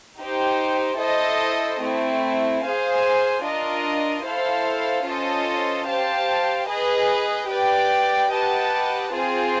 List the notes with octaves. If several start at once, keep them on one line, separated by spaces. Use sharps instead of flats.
D#4 G4 C5
E4 A4 C5 D#5
A3 C4 E4
G#4 C5 F5 G#5
D4 F4 A#4 D#5
E4 A4 C5 F5
C#4 F4 A4 C5 D#5
G4 C5 F5 A5
G#4 B4 D#5
G4 B4 D5 G5
G4 B4 D#5 F#5 A5
C4 F4 G#4 C5